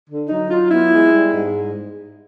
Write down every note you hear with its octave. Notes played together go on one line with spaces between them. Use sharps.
D3
F#3 D#4
F#3 F4
B3 E4
G#3
G3
G#2